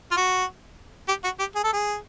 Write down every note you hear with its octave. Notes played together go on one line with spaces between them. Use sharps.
F4
F#4
G4
F#4
G4
G#4
A4
G#4